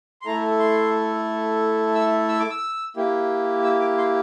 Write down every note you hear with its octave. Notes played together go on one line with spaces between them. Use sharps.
C6
A3 E4 A4 A#5
C6
E6
E6
D6
E6
A#3 E4 G4
E6
D6
C6